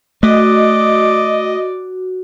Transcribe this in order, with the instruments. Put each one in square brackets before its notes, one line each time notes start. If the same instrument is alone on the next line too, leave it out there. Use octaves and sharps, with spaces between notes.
[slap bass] A3 [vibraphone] F#4 [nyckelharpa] D5 [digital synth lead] D#5